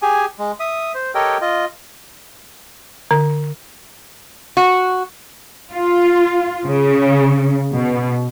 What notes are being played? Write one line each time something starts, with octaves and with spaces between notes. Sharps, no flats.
G4 G#4 G#5
G#3
E5 D#6
C5
G4 A4 A#4 C#5 D#5 G5
F4 D#5
D3
F#4
F4
C#3
B2